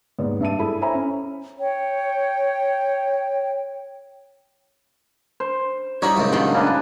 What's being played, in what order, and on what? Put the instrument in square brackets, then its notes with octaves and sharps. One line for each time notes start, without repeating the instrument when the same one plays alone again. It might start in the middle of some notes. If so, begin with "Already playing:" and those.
[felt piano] D#2 G#2 B3 D5
G2 E5 A5 D#7
D4 E4 G#4 A4 B5
C5 C#5 E5 G#5 A#5 B5
C#4
[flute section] C#5 G5
[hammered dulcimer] C5
[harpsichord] G3 [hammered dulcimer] D#4 [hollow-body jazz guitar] E4 F#4 C#5
[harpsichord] C#2 F#2 A#2
[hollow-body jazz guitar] G2 D#3 F3
[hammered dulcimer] C#3 D4 B4